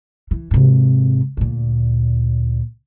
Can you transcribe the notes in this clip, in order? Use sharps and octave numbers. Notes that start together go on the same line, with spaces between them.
E3
G#2 C3
D2 A#2